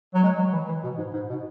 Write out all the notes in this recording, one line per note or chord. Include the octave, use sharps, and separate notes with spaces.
F#3
G#3
F#3
E3
E3
B2
G#2
G#2
B2